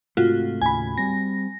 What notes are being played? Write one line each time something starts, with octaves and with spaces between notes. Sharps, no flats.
G#2 C3 A3 F4 F#4
D#2 A2 C#3 G#5 B5
G3 C4 A#6